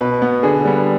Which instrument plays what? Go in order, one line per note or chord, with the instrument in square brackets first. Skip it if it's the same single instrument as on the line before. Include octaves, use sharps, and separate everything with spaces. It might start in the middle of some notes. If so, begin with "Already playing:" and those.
[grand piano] B2 B4
B3
D3 G#4
G3 B3